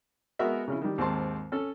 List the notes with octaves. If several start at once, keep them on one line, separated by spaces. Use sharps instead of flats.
G#3 B3 F#4 A#4 E5
C#3 C#4 E4
D#3 G3
D#2 G#2 C4 A5 C6
C#4 A4